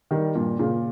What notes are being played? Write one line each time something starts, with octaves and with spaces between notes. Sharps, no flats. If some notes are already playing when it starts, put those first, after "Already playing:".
D#3 G3
G2 A#2
A#2 C#3